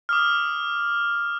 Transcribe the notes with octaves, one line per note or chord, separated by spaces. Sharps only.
D6 D#6 F6